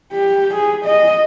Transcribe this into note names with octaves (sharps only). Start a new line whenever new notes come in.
G4
G#4
D#5